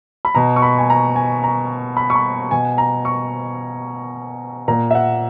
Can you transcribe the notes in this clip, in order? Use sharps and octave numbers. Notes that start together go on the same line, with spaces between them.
B5
B2 A#5
C#6
B5
G#5
A#5
G#5
A#5
B5
C#6
B5
B2 G#5
A#5
C#6
A#2 A#5
E5
F#5